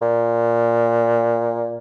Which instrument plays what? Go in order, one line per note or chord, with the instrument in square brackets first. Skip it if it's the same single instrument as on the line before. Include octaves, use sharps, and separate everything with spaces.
[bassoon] A#2